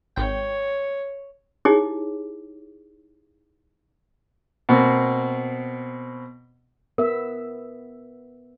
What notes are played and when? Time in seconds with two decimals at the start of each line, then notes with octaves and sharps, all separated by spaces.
0.16 G#1 C#5 G5
1.65 D#4 E4 G4 G#4 C#5 D6
4.69 B2 A#3 C4
6.98 B3 A#4 E5